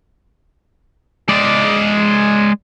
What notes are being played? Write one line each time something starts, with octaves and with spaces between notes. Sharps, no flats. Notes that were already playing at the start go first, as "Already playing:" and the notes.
G#3 D5